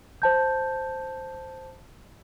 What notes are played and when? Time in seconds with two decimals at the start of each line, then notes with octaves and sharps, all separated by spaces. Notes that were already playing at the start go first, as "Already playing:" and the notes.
0.22 C5 A5 G6